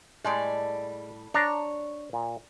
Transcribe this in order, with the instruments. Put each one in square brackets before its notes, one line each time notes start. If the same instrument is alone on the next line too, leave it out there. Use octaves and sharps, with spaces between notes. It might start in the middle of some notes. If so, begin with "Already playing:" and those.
[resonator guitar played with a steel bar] A2 G3 D5 [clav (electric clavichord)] G#3
[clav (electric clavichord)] D4 A#5 [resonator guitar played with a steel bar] C#5
[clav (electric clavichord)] A#2